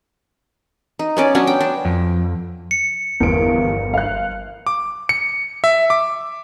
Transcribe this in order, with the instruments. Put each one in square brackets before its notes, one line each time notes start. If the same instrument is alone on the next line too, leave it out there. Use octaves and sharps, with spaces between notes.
[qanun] D#4
B3 C#4 D5
F#3 B3 C#4 D4
G5
D4
[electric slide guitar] F2
[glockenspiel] C#7
[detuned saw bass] G1 [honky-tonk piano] E2 D7 [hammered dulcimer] F3 A#4
[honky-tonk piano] F5 F#6
[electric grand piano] D6
C#7
E5
D6